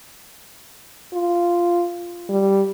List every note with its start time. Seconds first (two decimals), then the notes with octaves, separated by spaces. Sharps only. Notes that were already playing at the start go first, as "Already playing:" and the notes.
1.13 F4
2.29 G3